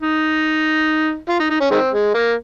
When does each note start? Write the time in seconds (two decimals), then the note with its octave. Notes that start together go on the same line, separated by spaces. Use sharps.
0.01 D#4
1.29 F4
1.40 D#4
1.50 D#4
1.61 C#4
1.71 D#3 G#3 C4
1.92 G#3
2.14 A#3